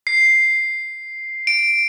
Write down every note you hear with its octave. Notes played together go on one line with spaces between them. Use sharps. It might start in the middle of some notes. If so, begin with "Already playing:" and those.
C7
D7